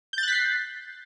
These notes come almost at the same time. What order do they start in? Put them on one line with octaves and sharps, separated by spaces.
G6 A6 F#6 B6 C7